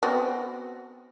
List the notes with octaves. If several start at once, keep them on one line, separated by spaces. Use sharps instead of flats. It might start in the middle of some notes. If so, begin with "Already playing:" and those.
B3 C4 F#4